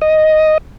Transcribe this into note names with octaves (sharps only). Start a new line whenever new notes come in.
D#5